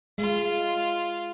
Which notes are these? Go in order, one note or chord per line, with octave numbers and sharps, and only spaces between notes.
G#3 F4